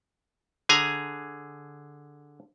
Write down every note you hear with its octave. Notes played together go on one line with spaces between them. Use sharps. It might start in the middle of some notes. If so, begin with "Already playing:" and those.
D3 G#4 G#5 A#5